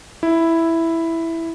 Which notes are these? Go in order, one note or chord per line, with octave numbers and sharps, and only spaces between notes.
E4